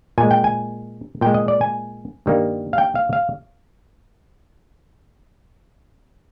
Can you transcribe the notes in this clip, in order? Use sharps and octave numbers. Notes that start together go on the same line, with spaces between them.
A#2 G#3 G#5
G5
G#5
A#2 G#3 G5
D#5
D5
G#5
G2 D#3 G3 A#3
F5
G5
F5
F5